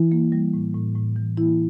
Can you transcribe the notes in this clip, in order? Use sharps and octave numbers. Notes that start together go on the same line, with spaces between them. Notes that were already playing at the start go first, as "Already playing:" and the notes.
Already playing: E3 E4
A#3
G3
A2
A2
A2
E3
E3 A#3 E4